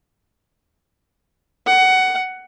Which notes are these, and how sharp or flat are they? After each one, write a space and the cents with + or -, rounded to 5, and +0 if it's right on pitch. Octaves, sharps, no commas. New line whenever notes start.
F#5 +15